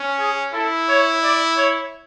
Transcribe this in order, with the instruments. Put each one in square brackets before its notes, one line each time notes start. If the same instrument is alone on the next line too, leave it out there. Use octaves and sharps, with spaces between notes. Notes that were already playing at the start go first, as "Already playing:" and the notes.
Already playing: [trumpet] C#4
[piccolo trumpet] G#4
[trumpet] E4 [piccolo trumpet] A4
[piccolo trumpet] C#5
D5
C#5